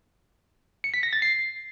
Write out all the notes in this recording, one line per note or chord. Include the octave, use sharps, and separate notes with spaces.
C#7
B6
A#6
A6
C7